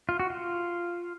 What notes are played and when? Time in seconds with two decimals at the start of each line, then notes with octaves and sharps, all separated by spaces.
0.09 F4
0.20 F#4
0.30 F4